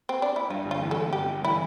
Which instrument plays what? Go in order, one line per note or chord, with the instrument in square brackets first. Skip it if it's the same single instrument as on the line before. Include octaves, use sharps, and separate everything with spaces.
[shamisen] C4
D4
E4
[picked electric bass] G2 [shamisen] F4
[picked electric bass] G1
[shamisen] F4
[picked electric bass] E3
[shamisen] A4
[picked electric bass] G1
[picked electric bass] G2 [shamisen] G4
[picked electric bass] G1
[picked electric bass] E3 [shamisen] E4